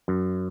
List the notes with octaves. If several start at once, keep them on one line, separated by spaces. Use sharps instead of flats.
F#2